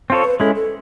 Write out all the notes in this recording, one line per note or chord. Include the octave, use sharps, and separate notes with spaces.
C4 F4 A4 C5 C#5
B4
G#3 C#4 E4 A4
A4